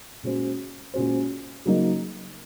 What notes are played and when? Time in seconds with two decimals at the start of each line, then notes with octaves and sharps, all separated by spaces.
0.23 A#2 G#3 C#4 F#4 C5
0.94 A#2 G#3 C#4 F#4 C5
1.65 C#3 F#3 A#3 D#4